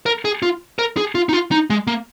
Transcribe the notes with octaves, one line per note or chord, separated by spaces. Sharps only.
A#4
G#4
F4
A#4
G#4
F4
D#4
F4
D#4
G#3
A#3